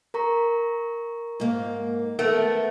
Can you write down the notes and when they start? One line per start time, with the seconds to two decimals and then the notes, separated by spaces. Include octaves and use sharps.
0.14 A#4 A#5 C#6
1.40 G#2 A#3
2.19 A3 B3 A#4 F#5